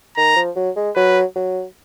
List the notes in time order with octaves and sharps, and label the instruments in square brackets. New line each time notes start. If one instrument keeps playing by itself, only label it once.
[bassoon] D#3 [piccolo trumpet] A#5
[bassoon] F3
F#3
G#3
[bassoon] F#3 [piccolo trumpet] B4
[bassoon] F#3